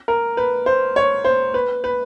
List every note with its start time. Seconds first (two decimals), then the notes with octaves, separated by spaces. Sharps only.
0.08 A#4
0.37 B4
0.66 C5
0.96 C#5
1.25 C5
1.54 B4
1.84 B4